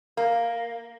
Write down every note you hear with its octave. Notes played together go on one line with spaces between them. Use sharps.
A#3